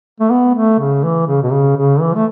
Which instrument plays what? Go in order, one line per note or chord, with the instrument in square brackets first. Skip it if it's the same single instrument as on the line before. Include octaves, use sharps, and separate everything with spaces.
[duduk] A3
B3
A3
C#3
E3
C#3
B2
C#3
C#3
E3
A3